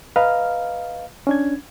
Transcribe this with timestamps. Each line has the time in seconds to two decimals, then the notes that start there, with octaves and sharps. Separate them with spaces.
0.16 B4 D#5 F5 A#5 F6
1.27 C#4 D4 G#6